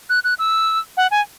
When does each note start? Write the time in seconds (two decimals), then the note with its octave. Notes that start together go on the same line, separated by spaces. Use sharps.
0.10 F#6
0.24 F#6
0.39 E6
0.97 F#5
1.11 G#5